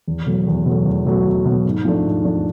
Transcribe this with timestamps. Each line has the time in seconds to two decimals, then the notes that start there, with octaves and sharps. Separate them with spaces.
0.08 E2
0.26 B2 F#3 A3
0.47 E2
0.66 B2 F#3 A3
0.85 E2
1.06 B2 F#3 A3
1.25 E2
1.45 B2 F#3 A3
1.65 G#2
1.85 F3 A3 D4
2.04 G#2
2.24 F3 A3 D4